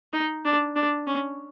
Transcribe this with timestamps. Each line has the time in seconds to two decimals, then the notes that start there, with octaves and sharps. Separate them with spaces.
0.13 D#4
0.45 D4
0.76 D4
1.07 C#4